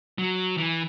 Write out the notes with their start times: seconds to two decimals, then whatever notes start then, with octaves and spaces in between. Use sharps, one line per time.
0.18 F#3
0.58 E3